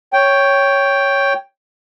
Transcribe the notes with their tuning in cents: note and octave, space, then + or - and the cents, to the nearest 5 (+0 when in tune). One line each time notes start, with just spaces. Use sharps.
C#5 +5 G5 +0